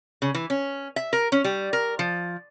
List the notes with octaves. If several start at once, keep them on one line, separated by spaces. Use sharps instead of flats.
C#3
E3
C#4
E5
A#4
C#4
G3
A#4
F3